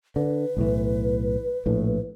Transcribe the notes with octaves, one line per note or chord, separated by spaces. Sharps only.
D3 B4
B1 A2 E3
A#1 A2